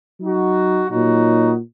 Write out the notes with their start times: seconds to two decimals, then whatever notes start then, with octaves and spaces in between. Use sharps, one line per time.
0.19 F#3 D#4 F#4
0.89 A#2 F#3 D#4 F#4